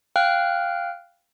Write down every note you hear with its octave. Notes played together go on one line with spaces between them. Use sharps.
F5 G5 F6 F#6